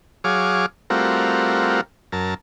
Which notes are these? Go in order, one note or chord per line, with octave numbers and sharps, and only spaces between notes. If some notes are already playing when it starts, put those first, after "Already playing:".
F#3 G#4 C#5 F5 D6
G3 A3 C4 F4 F#4 A#4
F#2 A#4 A5